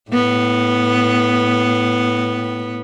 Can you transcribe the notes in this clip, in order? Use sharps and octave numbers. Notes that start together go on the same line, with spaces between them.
A2 B3